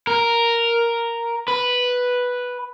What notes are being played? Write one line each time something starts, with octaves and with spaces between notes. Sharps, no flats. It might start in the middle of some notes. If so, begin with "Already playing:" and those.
A#4
B4